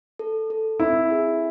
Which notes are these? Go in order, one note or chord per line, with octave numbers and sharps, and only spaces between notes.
A4
A4
C4 E4
G#4